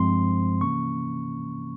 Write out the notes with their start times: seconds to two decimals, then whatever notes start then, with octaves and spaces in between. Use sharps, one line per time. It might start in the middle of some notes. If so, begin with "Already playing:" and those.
Already playing: G2 F3 G#3 C4 C6
0.61 C3 E3 A#3 C#4 C#6